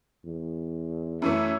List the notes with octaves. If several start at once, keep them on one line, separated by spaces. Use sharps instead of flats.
E2
F#2 E3 A3 E4 C#5 E5